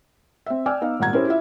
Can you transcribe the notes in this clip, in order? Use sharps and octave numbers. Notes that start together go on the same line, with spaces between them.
C4 E5
D5 G5 G#5 D6 E6 F6
B3 D#4 F5
G#1 A#2 G3 F#5 A#5 G#6
C#4 E4 G4 A#4 C5
E4 F4 E5